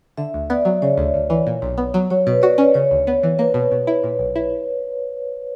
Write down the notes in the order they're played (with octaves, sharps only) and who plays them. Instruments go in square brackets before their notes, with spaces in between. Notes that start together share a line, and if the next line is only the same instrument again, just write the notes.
[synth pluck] D3 [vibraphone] E5
[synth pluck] D2
[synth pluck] B3 [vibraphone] D5
[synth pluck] F#3
[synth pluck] C#3 [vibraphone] C#5
[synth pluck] D2
D2
E3
A#2
B1
B3
F#3
[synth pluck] F#3 [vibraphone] C#5
[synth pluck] B2 [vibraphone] B4
[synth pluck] F#4 [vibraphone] D5
[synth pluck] C#4 [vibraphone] C#5
[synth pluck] C#3 [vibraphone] C#5
[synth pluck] D2
B3
E3
[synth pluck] A#3 [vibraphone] B4
[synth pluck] B2
B2
E4
A#2
B1
E4